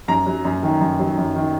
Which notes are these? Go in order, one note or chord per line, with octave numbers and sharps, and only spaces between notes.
F#2 A#5
F#3
F#2
D#3
F#2
F#3
F#2
D#3